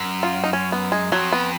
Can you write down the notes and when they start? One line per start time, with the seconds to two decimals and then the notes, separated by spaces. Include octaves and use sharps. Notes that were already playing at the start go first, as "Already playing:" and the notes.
Already playing: F#2
0.23 F4
0.44 D#4
0.53 C#4
0.72 B3
0.92 G#3
1.12 F2 F#3
1.33 B3